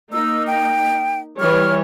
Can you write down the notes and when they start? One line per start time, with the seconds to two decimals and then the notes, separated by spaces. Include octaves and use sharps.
0.13 A#3 D#4 E6
0.47 G5
1.40 E3 G3 C#5 F6